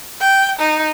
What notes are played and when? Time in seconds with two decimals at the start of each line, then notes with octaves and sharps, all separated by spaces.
0.21 G5
0.59 D#4